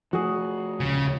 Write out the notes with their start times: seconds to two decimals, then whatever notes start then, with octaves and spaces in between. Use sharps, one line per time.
0.13 F3 A3 F#4 G#4
0.80 D#1 C#2 C#3